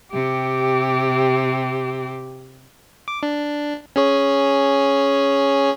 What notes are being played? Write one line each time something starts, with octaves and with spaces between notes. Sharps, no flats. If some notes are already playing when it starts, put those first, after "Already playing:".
C3 G4
D6
D4
C#4 G#4 C#5